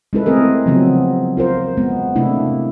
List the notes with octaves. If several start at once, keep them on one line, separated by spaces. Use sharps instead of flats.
G#3 C#4 E4 A4 B4
A3 C4 G#4 A#4
C#3 F3 F#3 B3 C4
F4 A#4 C5
G#3 B3
C3 A3 A#3 D4 E4